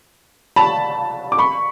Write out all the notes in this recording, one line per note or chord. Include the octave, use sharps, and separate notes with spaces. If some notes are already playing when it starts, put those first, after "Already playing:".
A5 B5
D6
B5 C#6